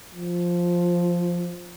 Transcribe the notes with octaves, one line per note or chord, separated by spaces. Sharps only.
F3